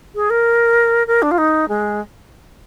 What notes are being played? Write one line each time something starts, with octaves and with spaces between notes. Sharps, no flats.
G#4
A#4
A#4
D4
F4
D#4
G#3